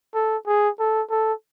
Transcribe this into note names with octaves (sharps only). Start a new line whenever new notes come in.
A4
G#4
A4
A4